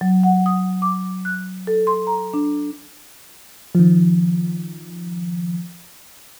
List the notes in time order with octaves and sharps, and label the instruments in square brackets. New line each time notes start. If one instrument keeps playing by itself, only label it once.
[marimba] F#3
F#5
D#6
D6
F#6
A4
C6
A#5
D4
[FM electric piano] D#3 F3